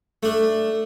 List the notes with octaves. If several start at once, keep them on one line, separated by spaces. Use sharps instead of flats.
A3 D4